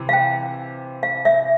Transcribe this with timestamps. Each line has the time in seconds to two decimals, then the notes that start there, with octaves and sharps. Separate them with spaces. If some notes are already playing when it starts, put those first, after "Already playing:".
Already playing: C3 E3
0.09 F5
0.13 G5
1.03 F5
1.25 E5